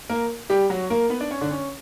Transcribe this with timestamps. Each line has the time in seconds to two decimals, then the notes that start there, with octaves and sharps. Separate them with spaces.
0.09 A#3 A#4
0.50 G3 G4
0.70 F#3 F#4
0.90 A#3 A#4
1.10 B3 B4
1.20 D4 D5
1.31 C#4 C#5
1.41 D3 D4
1.51 C#4